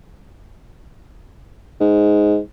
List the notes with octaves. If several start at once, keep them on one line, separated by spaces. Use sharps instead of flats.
G#2